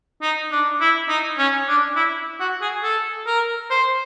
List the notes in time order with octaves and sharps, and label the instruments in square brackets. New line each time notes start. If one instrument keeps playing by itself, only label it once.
[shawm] D#4
D4
E4
D#4
C#4
D4
E4
F#4
G#4
A4
A#4
C5